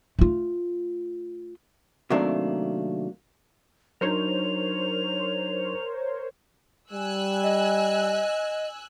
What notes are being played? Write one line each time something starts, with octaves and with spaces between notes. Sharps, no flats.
A3 F4
C3 D#3 F#3 A3 A#3 D4
F#3 D4 D#4 A#4 C5 C#5 F7
G3 G#5 E6 F#6
D#5